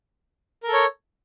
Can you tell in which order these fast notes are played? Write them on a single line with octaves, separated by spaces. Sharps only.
A#4 A4 C#5